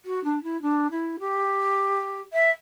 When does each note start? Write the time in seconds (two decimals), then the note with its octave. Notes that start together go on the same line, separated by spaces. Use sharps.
0.05 F#4
0.24 D4
0.43 E4
0.61 D4
0.90 E4
1.19 G4
2.33 E5